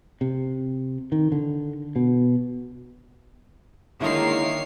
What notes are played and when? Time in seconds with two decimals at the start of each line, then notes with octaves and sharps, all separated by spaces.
0.21 C3
1.12 D#3
1.32 D3
1.96 B2
4.01 D3 D#3 G#3 A#3 E4 F4 C#5 C7